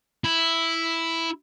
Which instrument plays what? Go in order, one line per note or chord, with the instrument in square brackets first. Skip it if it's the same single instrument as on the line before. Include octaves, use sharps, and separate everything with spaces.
[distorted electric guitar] E4